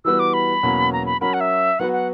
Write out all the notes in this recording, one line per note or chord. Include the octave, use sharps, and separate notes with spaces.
E3 G3 B3 F#4 B4 E6
D6
B5
E2 B2 F#3 A#3 C#4
A#5
B5
F#3 C#4 F#4 A#4 B5
F#5
E5
F#3 B3 F#4 B4 F#5
F#5